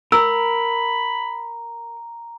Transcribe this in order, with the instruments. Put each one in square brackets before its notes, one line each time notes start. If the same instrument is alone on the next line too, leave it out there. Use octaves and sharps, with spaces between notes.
[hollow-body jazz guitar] A#4 [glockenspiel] A#5 [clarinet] B5 [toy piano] E6